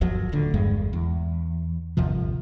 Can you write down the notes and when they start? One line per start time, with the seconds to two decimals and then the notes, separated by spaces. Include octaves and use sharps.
0.01 G1 D#2 F3 F#3
0.32 D1 D2 D3
0.54 G1 E2 G2 G#3
0.93 E2
1.97 G1 D#2 C3 F3